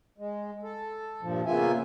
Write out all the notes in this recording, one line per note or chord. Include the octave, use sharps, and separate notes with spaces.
G#3
A4
G2 A#2 F3
C#3 A#3 B3 F4 E5 G#5